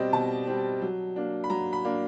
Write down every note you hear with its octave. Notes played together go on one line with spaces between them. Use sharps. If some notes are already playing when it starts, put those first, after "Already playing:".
Already playing: B2 G3 C4 D5 D#5
B2 A5
G3 C4
F#3
A#3 D4
B5
F#3 A#5
B5
A#3 D4